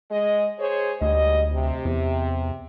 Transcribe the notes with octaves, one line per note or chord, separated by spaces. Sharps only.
G#3 D#5
G#4 C5 C#5
D2 G#2 G3 D#5
C3
E2